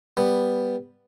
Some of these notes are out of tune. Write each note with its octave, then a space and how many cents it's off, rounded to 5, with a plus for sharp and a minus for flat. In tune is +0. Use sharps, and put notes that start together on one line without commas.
G3 +5 B3 +0